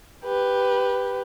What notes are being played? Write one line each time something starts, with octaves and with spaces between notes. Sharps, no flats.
G4 B4